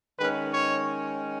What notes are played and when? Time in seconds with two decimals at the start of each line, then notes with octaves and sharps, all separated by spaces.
0.18 D#3 G#3 C#4 B4
0.52 C#5